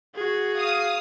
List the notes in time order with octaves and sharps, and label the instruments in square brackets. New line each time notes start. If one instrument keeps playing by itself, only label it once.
[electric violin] F#4 G#4
[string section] F5 D#6